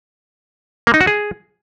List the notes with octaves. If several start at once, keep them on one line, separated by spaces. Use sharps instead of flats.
A#3
D#4
F#4
G#4